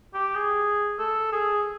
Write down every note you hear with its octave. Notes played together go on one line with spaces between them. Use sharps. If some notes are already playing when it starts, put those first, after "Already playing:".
G4
G#4
A4
G#4